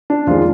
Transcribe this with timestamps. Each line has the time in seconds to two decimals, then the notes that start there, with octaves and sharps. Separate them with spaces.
0.10 D4
0.27 F2 D#3 G#3 F4